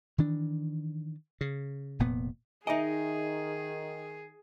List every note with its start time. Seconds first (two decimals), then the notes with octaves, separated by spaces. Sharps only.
0.18 D#3 E3 D4
1.41 C#3
1.99 F1 A#2 B3
2.67 D#3 D#4 G#4 D#5 E5 G#5